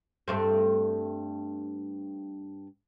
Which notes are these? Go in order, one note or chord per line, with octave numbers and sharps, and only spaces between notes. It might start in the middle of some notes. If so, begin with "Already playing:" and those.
G2 A3 C4